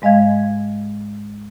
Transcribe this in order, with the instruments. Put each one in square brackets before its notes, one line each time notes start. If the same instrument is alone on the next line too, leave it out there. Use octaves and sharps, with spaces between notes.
[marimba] G#2 G#3 D#5 F5 G#6